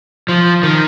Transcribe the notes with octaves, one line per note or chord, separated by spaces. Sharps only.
F3
D#3